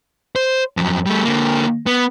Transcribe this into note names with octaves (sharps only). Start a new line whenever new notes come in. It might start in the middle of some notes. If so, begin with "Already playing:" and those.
C5
F2 F#3
G3 A3
D3 A#3
B3